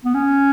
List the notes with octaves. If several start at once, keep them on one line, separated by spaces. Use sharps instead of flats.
B3
C#4